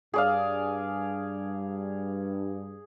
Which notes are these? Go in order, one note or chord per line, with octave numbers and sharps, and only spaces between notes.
G2 G#4 D5 F5